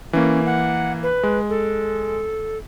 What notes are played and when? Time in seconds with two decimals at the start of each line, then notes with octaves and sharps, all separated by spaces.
0.13 E3 A#3 C#4
0.46 F#5
1.03 B4
1.23 G#3
1.50 A4